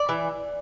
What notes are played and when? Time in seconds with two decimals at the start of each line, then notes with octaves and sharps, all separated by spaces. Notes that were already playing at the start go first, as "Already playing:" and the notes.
Already playing: D5
0.09 E3